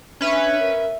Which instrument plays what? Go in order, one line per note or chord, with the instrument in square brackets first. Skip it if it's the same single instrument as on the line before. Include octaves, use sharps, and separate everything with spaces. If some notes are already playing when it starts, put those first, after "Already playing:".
[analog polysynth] C#4 B4 [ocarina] D4 [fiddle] E5
[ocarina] A#4